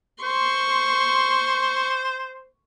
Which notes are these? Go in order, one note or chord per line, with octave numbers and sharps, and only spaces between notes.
C5 C6 C#6